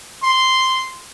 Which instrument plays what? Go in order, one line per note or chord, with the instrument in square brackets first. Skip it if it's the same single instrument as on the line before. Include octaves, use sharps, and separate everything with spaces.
[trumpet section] C6